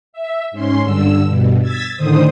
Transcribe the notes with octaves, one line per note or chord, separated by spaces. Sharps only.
E5
G#2 C#4 C6
G2 D3 E6
G2 B2
E6 G#6 A6 B6
A2 D3 D#3 C5 D#6